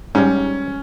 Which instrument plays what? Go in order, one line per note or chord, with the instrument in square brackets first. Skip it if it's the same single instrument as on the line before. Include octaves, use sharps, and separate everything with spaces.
[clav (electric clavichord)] G#2 G3 [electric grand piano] C#4